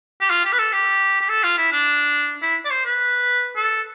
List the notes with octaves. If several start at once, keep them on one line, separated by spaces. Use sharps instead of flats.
G4
F4
G4
B4
A4
G4
G4
A4
F4
E4
D4
E4
D5
C5
B4
A4